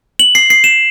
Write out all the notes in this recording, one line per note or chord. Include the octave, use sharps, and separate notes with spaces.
F#7
C7
C7
E7